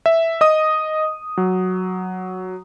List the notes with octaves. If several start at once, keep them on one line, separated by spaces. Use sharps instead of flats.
E5
D#5 D#6
F#3